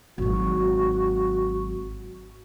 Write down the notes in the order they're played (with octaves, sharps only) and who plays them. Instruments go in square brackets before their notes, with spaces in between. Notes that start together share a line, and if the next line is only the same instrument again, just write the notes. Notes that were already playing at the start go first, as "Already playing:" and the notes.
[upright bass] G#1 F#3 [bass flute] F#4